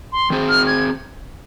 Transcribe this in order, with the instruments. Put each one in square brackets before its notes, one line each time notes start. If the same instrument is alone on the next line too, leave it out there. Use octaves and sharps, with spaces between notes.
[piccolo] C6
[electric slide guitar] D#3 C4 G#4 C5
[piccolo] F6
G#6